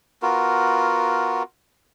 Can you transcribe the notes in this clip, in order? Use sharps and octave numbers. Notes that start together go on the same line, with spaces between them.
B3 F4 F#4 A#4